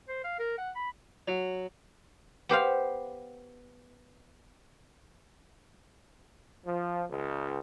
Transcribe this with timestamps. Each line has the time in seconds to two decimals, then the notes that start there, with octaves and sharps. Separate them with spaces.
0.09 C5
0.24 F5
0.39 A#4
0.58 F#5
0.76 B5
1.28 F#3
2.49 B3 G4 C5 F5
6.65 F3
7.09 C#2